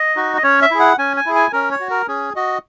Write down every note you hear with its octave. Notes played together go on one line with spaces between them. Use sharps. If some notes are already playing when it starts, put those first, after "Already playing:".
Already playing: D#5
D#4 F#4
D#5
C#4 C#5
E5
E4 G#4
F#5
C#4 G#5
G#5
E4 G#4
G#5
C#4 A#4
C#5
F#4
A#4
C#4 G#4
F#4 D#5